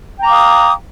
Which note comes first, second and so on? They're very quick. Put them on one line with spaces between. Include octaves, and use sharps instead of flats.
G5 A#5 D6 F5 D#6